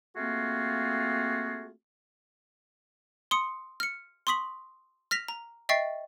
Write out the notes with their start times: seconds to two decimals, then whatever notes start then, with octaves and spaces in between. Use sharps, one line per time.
0.17 A3 A#3 C4 F4 F#4 G#4
3.31 C6 D#6 C#7
3.80 F6 C#7
4.27 C6 C#6 D#6 B6 F#7
5.11 F6 A#6 B6 F7
5.28 A#5
5.69 D#5 E5 G5 C#6 A6 C7